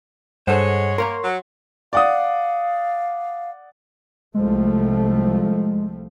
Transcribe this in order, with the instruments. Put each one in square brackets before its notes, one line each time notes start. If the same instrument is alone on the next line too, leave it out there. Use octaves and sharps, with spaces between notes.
[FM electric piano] G2 F#5 [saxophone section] G#3 C#5 [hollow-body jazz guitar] A4 C5
[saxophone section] A#3 [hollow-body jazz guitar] A#4 C#5 A#5 [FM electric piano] C6 C#6
[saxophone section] F#3
[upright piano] D5 F#5 D#6 [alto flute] F5
[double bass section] C2 F3 A3 [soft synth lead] G#3